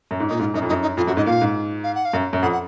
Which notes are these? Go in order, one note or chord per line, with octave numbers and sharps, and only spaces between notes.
F#2
G#2
A#2 D#4
G#2 F4
F#2 D#4
F2
F#2 D#4
D#4
F2 F4
F#2 F#4
G#2 D#5
A#2 F5
G#2
F5
F#5
F5
F#2
F#2
F2 F#5
F#5